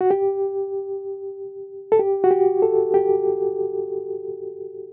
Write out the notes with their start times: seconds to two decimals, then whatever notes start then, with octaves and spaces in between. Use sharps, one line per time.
0.01 F#4
0.11 G4
1.92 A4
1.99 G4
2.24 F#4
2.31 G4
2.62 A4
2.94 G4